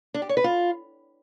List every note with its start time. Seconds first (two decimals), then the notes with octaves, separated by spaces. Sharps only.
0.14 D4
0.22 G4
0.29 C#5
0.37 B4
0.44 F4